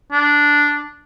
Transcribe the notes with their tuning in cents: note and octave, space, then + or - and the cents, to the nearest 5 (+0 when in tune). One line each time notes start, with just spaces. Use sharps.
D4 -5